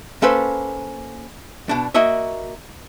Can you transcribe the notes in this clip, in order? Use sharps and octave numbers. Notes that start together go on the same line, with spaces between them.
A#3 C#4 A4 B4 C5
B2 D4
A#3 F#4 D#5 E5